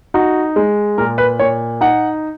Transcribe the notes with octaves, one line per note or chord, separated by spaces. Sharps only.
D#4 F#4
G#3
A#2 A#4
B4
A#2 C#5
D#4 F#5